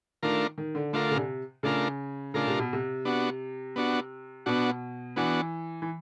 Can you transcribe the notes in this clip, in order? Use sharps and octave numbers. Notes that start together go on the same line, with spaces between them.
D#3 A3 D4 F4 A#4
D#3
D3
D3 A3 D4 F4 A#4
C#3
C3
C#3 A3 D4 F4 A#4
C#3 A3 D4 F4 A#4
C3
B2
C3
B3 D4 F#4
B3 D4 F#4
B2 B3 D4 F#4
E3 B3 D4 F#4
E3